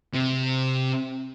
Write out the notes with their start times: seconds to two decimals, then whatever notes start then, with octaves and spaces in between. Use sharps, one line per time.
0.14 C3